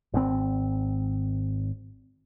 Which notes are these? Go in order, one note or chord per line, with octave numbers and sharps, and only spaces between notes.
G#1 C4